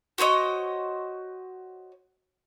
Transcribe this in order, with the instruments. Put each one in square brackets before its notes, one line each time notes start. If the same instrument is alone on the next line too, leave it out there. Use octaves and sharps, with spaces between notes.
[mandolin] F#4 C5 C#5 D#5